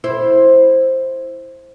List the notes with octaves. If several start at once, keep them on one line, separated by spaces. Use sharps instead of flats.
E4 C5